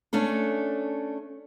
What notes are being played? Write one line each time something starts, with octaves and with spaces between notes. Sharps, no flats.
A3 C#4 D4 A4